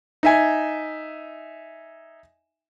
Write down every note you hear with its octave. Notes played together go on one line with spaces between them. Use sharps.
D#4 E5 G#5